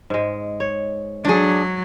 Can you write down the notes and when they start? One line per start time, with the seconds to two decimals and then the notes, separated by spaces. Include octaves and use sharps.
0.10 G#2 G#3
0.60 C#5
1.25 F#3 D4 G#4